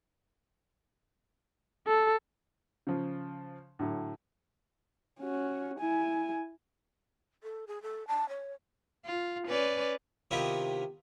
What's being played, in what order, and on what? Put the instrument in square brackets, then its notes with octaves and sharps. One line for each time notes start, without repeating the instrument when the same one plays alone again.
[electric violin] A4
[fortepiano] C#3 F3
A2 D3 F#3
[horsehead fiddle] C#4 F#4
E4 G#5
[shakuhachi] A4
G#4
A4
A5
C#5
[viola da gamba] F4
C#4 B4 D5
[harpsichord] C3 D#3 B3 E4 F4 G4